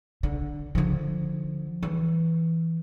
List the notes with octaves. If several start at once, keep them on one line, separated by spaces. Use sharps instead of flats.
D3
D3 F3
E3